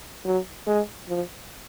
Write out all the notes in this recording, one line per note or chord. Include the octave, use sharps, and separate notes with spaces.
F#3
G#3
F3